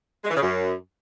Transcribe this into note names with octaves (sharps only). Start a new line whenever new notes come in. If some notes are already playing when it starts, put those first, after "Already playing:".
G#3
E3
C#3
F#2